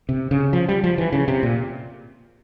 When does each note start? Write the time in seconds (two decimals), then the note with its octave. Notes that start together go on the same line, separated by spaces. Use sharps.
0.09 C3
0.31 C#3
0.53 F3
0.69 G3
0.84 F3
0.98 E3
1.13 C#3
1.28 C3
1.43 A#2